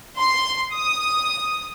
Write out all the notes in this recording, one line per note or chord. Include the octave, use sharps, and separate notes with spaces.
C6
D#6